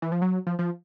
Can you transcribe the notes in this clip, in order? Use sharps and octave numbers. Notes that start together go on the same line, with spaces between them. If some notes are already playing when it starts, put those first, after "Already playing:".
E3
F3
F#3
F3
F3